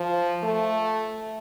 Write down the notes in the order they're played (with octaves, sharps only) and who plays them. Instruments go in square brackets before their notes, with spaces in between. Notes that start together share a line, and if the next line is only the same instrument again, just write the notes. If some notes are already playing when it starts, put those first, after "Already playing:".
Already playing: [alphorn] F3
A3